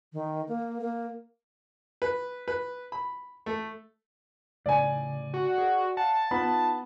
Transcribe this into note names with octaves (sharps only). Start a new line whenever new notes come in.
D#3
A#3
A#3
B4
B4
B5
A3
A2 C#3 D5 G#5
F#4
G#4 A#4
F5 F#5 A5
B3 D#4 F4 B5